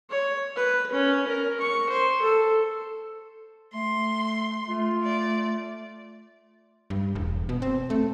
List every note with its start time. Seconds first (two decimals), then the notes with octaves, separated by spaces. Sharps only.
0.10 C#5
0.56 B4
0.92 C#4
1.27 A#4
1.60 C#6
1.89 C5
2.22 A4
3.74 A3 C6
4.68 A3 F4
5.03 D5
6.90 G2
7.15 E1
7.49 B2
7.62 C4
7.90 A3